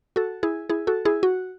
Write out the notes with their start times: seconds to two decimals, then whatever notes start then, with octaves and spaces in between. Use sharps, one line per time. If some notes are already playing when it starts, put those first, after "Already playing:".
0.16 F#4 A4
0.43 E4 G#4
0.70 E4 G#4
0.87 F#4 A4
1.05 E4 G#4
1.23 F#4